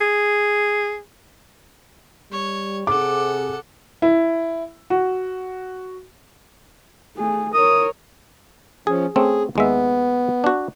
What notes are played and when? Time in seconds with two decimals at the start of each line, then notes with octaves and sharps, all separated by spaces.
0.01 G#4
2.32 G3 C#5
2.87 C3 G#4 A4 F#5 D6
4.02 E4
4.90 F#4
7.16 A3 G#4
7.54 A#4 C#5 D#6
8.87 F3 C#4 G#4
9.16 A3 C4 C#4 G#4
9.56 D#2 G#3 B3 E5
10.44 D4 F#4